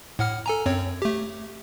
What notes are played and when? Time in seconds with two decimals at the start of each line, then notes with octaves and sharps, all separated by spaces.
0.19 A2 F#5 F6
0.46 A4 G#5 A#5
0.66 F#2 C4 C#5
1.02 A3 G4